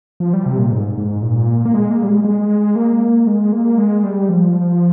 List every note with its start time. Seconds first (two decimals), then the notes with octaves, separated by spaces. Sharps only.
0.20 F3
0.33 G3
0.46 C3
0.58 A#2
0.72 G#2
0.98 G#2
1.22 A#2
1.65 A#3
1.74 G#3
1.91 A#3
2.03 G3
2.08 G#3
2.24 G#3
2.76 A#3
3.27 G#3
3.53 A#3
3.78 G#3
4.04 G3
4.29 F3